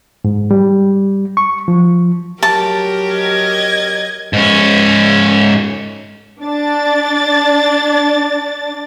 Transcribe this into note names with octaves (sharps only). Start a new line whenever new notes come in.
G#2
G3
C#6
F3
F#3 G4 A#4 A5
D#5 G#6
G#2 C#4
D4 D5 A6